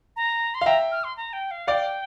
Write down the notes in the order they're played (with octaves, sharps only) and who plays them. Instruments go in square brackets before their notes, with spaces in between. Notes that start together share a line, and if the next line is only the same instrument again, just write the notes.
[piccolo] A#5
C6
[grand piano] F5
[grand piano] E5 G5 [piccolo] A#5
[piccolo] F6
C6
A#5
G5
F5
[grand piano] D5 F5 [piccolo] G5